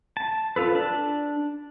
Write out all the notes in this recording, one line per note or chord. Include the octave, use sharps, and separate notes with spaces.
A5
F4 A4 B4
D4 A5